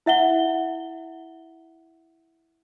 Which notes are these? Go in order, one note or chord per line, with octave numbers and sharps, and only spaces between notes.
E4 E5 F#5 G7